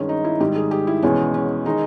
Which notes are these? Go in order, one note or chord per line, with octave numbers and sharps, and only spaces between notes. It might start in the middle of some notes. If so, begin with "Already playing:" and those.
Already playing: G2 D#3 G#3 C#4
D#4
E4
G#2 D#3 G3 G4
G#4
G4
E4
E2 B2 G#3 C#4
C#4
D#3 G#3 D#4